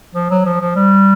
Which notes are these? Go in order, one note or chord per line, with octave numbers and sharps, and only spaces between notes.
F3
F#3
F3
F3
G3